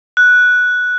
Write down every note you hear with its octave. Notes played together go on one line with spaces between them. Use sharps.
F#6